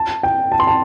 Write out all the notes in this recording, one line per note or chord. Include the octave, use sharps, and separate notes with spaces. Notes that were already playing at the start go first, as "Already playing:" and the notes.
Already playing: A5
G5
A5
C6
A5